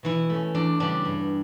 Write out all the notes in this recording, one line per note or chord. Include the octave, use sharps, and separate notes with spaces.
B2 E3 E4
A3 C#4
E2 D4
C#3 G3 B3 D4
G2